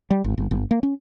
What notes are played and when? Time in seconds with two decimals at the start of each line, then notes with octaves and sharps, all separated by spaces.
0.11 G3
0.24 G#1
0.38 G1
0.51 G1
0.71 A#3
0.83 C#4